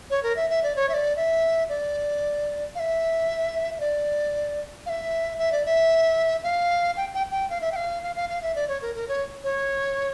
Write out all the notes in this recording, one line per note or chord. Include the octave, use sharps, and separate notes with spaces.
C#5
A#4
E5
E5
D5
C#5
E5
D5
E5
D5
F5
E5
E5
D5
F5
E5
E5
D5
E5
F5
G5
G5
G5
F5
E5
G5
F5
F5
F5
F5
E5
D5
C#5
A#4
A#4
C#5
C#5